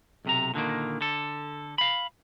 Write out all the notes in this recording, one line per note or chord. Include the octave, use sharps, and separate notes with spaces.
B1 C3 A#5
A#2 D3 D#3 A#3
D3 A4
F5 B5